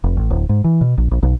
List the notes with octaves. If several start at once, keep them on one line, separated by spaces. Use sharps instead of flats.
F1
A1
D1
G#2
E3
B2
A#1
A#1
B1